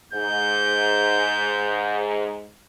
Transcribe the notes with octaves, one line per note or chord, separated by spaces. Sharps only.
G#2 G6